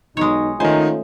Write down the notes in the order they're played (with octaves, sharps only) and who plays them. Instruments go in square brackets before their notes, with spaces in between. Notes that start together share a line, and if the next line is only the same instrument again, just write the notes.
[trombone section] B1 D#4 [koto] G#3 C#5
[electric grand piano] D#3 G#5 [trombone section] A3 C#4 F4 [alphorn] D#4 [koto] C5